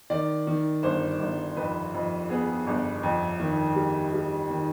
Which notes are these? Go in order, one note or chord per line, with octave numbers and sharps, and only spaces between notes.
D#3 D5
D#3
G1 C5
G1
F2 B4
F2
B3 G#4
G1
F2
D#3
G3
G3
D#3